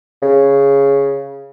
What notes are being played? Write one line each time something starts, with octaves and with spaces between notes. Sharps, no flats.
C#3